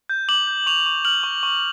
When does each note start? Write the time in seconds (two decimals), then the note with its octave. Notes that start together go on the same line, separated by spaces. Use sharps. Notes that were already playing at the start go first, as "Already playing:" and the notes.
0.09 G6
0.28 D6 F#7
0.47 G6
0.66 C#6 F7
0.86 C#6
1.05 F6 F#7
1.23 C#6
1.43 C#6